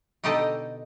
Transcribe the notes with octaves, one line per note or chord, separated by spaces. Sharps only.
B2 D3 D#4 G4 A4 D#5